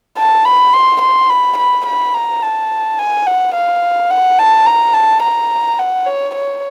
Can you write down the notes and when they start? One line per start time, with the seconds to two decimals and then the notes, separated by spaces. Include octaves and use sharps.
0.18 A5
0.45 B5
0.74 C6
1.01 C6
1.29 B5
1.58 B5
1.86 B5
2.14 A#5
2.42 A5
2.99 G#5
3.26 F#5
3.55 F5
4.10 F#5
4.39 A5
4.66 A#5
4.94 A5
5.23 A#5
5.79 F#5
6.06 C#5
6.35 C#5